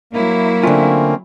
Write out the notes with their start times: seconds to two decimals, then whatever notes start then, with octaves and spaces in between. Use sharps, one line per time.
0.13 F#3 A#3 E4
0.63 D3 A3 C4 C#4 F4